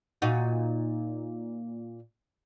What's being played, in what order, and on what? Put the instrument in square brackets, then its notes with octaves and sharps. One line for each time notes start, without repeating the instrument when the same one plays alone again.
[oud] A#2 D#4 F#4